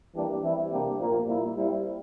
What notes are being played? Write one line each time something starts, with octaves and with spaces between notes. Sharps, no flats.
E3 G3 A#3 D4 G4
E3 G3 C4 E4
C3 G3 A#3 D4 G4
A#2 F3 A#3
A#2 G3 A#3 E4
G3 C4 E4